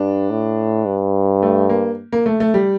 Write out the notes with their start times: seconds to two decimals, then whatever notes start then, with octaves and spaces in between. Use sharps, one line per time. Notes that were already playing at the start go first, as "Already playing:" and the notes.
Already playing: G2 D4
0.30 A2
0.86 G2
1.43 A3
1.70 A#3
2.13 A#3
2.26 A3
2.40 A3
2.54 G3